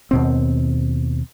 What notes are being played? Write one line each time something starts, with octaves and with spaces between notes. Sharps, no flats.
D#2 B2 C4